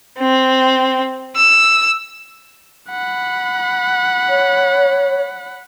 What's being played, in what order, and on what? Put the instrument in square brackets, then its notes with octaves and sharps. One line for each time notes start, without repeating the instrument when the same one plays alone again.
[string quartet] C4
E6
[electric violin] F#5 B5
[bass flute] C#5